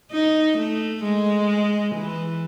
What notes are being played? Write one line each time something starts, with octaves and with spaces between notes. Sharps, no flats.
D#4
A3
G#3
E3